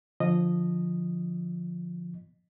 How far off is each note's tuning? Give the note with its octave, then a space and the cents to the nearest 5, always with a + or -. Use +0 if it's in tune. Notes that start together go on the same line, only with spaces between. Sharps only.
D3 +10 F3 +0 D#5 -10